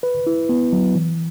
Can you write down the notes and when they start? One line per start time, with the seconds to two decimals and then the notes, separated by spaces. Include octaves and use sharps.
0.03 B4
0.27 E4
0.49 B3
0.73 F#3
0.95 E3